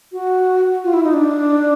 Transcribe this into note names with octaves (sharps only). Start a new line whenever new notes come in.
F#4
F4
E4
D#4
D4